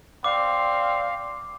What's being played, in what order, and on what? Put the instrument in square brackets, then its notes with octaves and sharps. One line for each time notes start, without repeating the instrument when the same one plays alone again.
[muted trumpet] C4 [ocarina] D5 [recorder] F5 [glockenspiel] D6